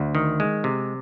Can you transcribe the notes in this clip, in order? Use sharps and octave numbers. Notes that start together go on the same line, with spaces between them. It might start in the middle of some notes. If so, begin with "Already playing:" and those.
Already playing: D2
D#3
G#3
C3